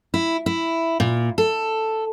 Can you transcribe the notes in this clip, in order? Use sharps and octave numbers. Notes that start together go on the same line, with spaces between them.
E4
E4
A#2
A4